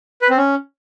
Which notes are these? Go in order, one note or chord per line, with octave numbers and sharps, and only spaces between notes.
B4
C4
C#4